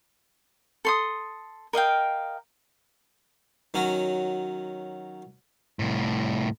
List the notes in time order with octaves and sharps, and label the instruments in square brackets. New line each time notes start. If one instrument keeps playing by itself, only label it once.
[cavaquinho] A4 C6 D#6
A#4 D#5 F5 G5
[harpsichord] D#3 F#3 C#4 F#4
[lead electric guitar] C2 A2